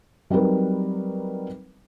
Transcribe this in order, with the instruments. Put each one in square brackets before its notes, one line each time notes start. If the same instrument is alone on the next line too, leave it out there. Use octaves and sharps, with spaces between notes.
[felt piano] F#3 G3 C4 D#4 A#4 B4